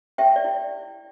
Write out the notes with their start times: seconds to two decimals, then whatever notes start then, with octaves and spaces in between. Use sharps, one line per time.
0.18 G4 E5 G5
0.36 D5
0.44 E4